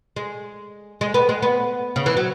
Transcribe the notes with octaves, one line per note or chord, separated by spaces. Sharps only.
G#3
G#3
B3
G#3
B3
C#3
E3
F#3